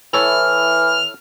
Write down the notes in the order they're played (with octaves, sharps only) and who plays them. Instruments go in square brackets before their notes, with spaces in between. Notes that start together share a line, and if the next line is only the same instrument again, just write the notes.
[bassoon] E3 [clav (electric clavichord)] E4 A4 C#5 [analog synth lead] F6